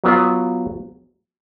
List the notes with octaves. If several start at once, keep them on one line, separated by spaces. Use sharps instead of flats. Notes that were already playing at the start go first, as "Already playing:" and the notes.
F#3 B3 F4 B4